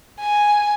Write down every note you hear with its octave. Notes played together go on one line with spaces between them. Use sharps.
G#5